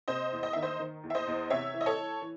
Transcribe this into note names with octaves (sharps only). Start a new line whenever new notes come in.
C3 C5 D#5
E2
D#5
D#3 E5
C5 D#5
D#3
E2
E5
C5 D#5
E2
C3 C#5 E5
E3
D#5
A4 C#5
E3
E3